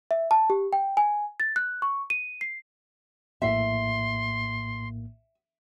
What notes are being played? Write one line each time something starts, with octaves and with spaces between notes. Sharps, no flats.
E5
A5
G4
G5
G#5
A6
F#6
C#6
D#7
C7
A#1 A2 A#3 E5 C6